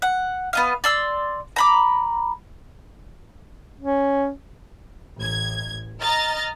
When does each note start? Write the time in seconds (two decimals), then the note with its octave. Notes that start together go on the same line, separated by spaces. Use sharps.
0.02 F#5
0.53 B3 D#5 F5
0.84 D5 C6 E6
1.56 A#5 B5 D6
3.80 C#4
5.18 A1 G#6
6.01 D#5 A#5 F6 A6